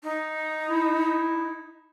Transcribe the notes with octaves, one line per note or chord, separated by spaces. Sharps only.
D#4
E4